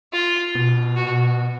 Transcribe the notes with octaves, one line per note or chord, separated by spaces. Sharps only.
F4
B2
F#4